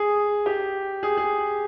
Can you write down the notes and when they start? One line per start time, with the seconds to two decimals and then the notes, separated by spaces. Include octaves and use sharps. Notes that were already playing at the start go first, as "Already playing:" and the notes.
Already playing: G#4
0.46 G4
1.03 G#4
1.17 G#4